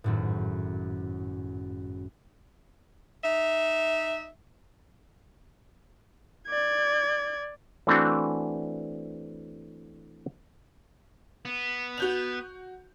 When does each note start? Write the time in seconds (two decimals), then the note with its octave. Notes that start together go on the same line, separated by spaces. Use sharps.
0.04 G#1 F#2 A2
3.24 D#4 E5
6.47 D5 G#6
7.87 E3 A3 C4 D4 F#4
11.45 B3
11.98 F#4 G6 F7